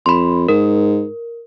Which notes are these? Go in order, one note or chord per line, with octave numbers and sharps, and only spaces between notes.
F2 B5 C6
G#2 A#4